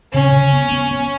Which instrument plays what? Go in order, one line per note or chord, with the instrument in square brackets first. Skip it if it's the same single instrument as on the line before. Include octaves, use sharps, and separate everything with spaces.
[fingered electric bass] C#3 [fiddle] C#4
[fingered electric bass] C#3
B3
B3
B3